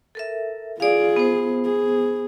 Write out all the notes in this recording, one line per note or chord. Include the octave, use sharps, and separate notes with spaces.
A4 A#4 E5
F4 G#4 D5 F5
B3 C5
G#4